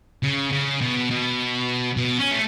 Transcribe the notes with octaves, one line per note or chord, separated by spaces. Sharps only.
C#3
C#3
B2
B2
B2
C#4
A3